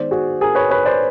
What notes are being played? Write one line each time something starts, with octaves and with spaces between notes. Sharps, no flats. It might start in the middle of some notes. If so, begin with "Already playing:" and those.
Already playing: D#3 G#3 B3 C5 D5
F#4 G#4
G#4 A#4
B4 C#5
B4 C#5
C5 D5